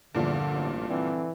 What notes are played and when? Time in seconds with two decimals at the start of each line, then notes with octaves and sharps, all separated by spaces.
0.15 E2 G2 A#2 D3 F3
0.53 A1
0.89 D3 E3 C4